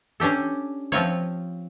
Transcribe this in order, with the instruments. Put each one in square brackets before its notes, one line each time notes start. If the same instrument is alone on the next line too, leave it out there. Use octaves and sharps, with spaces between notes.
[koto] C#4 D4 G4 A4
F3 C4 F4 C#5